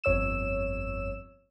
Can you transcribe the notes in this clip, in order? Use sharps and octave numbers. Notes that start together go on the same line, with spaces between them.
G1 F2 C#5 E6 E7